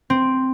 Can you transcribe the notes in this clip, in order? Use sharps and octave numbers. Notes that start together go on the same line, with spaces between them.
C4